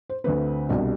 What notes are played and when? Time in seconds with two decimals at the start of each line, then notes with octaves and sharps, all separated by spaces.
0.09 C5
0.24 D2 D3 A3 C4 B4
0.69 C2 B2 G3 D4